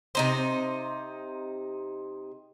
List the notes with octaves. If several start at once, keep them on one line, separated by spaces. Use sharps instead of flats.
C3 D#4 C5